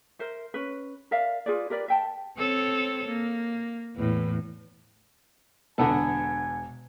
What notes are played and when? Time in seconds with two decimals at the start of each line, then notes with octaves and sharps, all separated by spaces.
0.19 A#4 C5 E5
0.54 C#4 B4
1.11 A#4 D5 E5 F5
1.46 F4 G#4 B4 D5
1.70 G4 A#4 B4 D5
1.88 E5 G5 A5
2.37 C4 A4 C#5
3.08 A#3
3.96 E2 A2
5.78 E1 D3 B3 A4 G#5